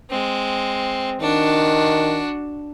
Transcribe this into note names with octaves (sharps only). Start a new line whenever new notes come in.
G#3 C4
D#3 D4 F#4